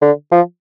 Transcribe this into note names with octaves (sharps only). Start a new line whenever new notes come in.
D3
F3